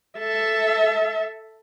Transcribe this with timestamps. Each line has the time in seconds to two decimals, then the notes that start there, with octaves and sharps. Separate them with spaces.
0.18 A4 E5